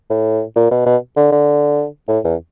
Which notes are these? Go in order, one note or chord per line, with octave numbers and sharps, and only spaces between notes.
A2
A#2
B2
B2
D3
D3
A2
E2